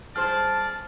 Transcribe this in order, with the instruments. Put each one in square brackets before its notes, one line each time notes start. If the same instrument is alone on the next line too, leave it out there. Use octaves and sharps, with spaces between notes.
[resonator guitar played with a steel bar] G2 G#4 C5 [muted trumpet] D5 [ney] A5 [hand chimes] F6